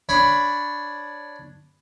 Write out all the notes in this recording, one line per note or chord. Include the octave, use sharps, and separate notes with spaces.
D4 C#5 B5